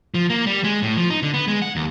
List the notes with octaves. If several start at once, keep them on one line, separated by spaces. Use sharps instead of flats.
F3
A#3
G3
G#3
A2
F3
D#4
D3
B3
G#3
F#5
D#2